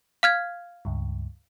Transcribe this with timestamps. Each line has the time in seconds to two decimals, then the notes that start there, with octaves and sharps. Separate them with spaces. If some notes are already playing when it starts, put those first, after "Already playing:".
0.23 F5 F6 G#6
0.85 C#2 G2